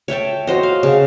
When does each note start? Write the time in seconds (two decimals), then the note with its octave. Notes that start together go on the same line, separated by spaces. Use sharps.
0.08 C#5 E5 G5 A5
0.47 F#4 C5 D#5
0.63 F5
0.83 C#3